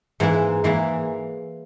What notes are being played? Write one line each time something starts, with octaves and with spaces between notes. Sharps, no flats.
G#2 E3 A#3 E4
G#2 E3 A#3 E4